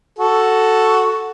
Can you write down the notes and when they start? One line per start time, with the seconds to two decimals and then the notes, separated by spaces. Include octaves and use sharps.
0.19 F#4 A4